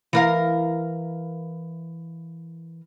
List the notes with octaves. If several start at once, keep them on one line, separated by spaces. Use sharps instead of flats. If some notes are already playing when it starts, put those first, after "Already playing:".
E3 A#4 F5